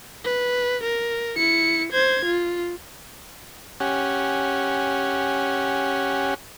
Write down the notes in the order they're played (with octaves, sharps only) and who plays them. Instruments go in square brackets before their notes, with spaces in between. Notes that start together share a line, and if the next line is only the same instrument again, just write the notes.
[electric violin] B4
A#4
E4 C#7
C5 G#6
F4
[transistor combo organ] C#4 G4 F#5 G#5